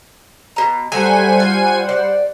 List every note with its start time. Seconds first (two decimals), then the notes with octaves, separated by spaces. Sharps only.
0.56 B2 A#5
0.92 F#3 G3 A3 C5 F#5 G#5
1.40 F4
1.89 D5